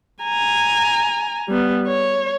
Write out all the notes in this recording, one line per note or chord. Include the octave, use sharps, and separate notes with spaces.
G#5 A#5
G3 B3
C#5